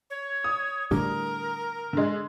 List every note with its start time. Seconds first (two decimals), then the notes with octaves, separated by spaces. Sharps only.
0.10 C#5
0.44 D#6
0.91 A2 D3 G3 A#4
1.93 D3 G#3